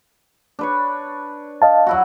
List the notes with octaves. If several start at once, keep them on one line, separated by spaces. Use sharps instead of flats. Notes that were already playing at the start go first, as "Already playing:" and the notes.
D4 B4 C#5
D#5 F5 A5
F#3 E4 F#4